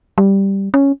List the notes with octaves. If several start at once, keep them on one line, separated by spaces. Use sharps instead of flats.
G3
C#4